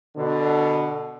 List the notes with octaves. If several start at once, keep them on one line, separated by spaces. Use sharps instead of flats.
B2 D3